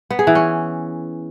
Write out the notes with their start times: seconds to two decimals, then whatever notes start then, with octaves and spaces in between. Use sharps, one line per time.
0.10 B3
0.19 G#4
0.27 E3
0.35 C#4